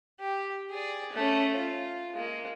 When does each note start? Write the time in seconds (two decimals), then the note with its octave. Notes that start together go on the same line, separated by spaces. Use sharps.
0.20 G4
0.71 G#4 D5
1.13 A3 C#4
1.57 F4
2.15 G#3 A#3